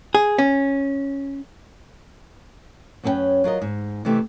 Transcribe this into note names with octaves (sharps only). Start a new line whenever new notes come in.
G#4
C#4
F#2 B3 C#4 A4 B4 G5
F#3 F4 A#4 D#5
G#2
C3 E3 A3 G4 D#5